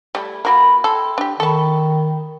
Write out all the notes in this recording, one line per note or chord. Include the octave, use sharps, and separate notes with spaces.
G3 A3 E4
A#3 E4 F#4 A#4 B4 F5
E4 A4 G5 C6
D4 G4
D#3 A4 E5 A5 B5 C#6